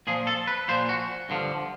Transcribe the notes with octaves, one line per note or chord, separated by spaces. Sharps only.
A#2 F3 G#4
A4
B4
A#2 F3 C5
F#4
G2 D3 F3